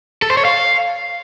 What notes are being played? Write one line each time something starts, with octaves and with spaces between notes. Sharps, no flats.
A4
C5
C#5
F5